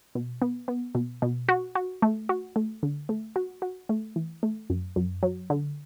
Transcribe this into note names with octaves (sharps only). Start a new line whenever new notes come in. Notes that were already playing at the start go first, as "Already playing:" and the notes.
B2
B3
B3
B2
B2
F#4
F#4
A3
F#4
A3
D3
A3
F#4
F#4
A3
E3
A3
F#2
F#2
F#3
D3